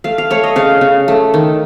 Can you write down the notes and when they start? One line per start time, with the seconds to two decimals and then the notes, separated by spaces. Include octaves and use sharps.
0.04 A3 F5
0.18 F5
0.30 A3 C#5
0.44 D#5
0.56 C#3 F5
0.81 C#3
1.08 A3
1.34 D#3